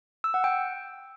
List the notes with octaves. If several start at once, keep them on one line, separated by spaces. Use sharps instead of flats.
E6
F#5
G5